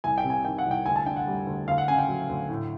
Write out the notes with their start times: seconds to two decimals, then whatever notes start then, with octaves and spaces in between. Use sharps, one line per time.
0.04 C2 G#5
0.18 G5
0.24 C3
0.30 G#5
0.45 D#3 G5
0.58 F#5
0.66 C2
0.71 G5
0.86 D2 G#5
0.96 A5
1.06 D3 G5
1.16 F#5
1.27 G3
1.47 D2
1.68 D2 F5
1.78 F#5
1.88 C#3 G#5
1.98 G5
2.08 F#3
2.29 D2
2.49 A2